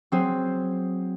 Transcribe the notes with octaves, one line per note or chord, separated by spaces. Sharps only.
F#3 C4 G#4